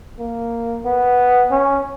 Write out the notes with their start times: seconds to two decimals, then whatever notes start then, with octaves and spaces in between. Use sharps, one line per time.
0.19 A#3
0.85 B3
1.51 C#4